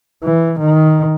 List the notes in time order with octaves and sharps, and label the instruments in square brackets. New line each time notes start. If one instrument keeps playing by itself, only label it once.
[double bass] E3
D#3